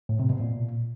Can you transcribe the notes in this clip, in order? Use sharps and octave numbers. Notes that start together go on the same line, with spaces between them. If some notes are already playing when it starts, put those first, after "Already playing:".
A2
C3
B2
A#2